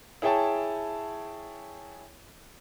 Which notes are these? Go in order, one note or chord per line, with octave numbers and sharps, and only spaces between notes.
E4 G#4 C#5 G5 A5